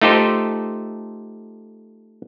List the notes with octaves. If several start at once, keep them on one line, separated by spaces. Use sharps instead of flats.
A3 D#4 F4 G4 A4 C5